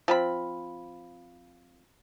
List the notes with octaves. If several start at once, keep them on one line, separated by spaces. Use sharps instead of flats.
F3 C4 B5